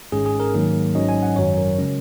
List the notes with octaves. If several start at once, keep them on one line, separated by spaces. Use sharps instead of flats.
G#1 G#2 G#3 C#4 G#4
G#4
A#4
G#2 D#3 F#3 A#3
G#1 G#2 F#3 C#4 D#5
G#5
F#5
G#1 F#2 F#3 C#5
A#4
C#3 G#3 C#4